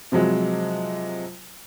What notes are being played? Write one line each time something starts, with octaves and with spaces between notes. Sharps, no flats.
C3 F3 F#3 G#3